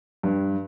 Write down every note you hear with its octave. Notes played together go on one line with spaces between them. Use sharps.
G2